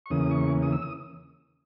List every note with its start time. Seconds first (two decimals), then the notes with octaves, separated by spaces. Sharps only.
0.06 C#6
0.10 E2 C#3 E3 A#3 C#4 D#6
0.31 C#6
0.62 D#6
0.72 E6
0.82 D#6